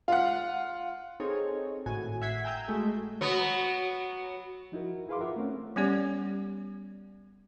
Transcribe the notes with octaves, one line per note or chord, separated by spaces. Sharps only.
F4 F#5
C4 D#4 G#4 A4 C#5
G#1 A2 F#4 G#5
E5 F#5 G#6 B6 C7
G5 G#5 A#5 E6 G6
G#3 A3 F#4
F#3 B3
F3 D#4 E4 F#4 A#4
E4 G#4 B4 F5 C6 D6
F4 A#4 E5 F#5
A3 C4 C#4
G3 B3 C#4 G4 D5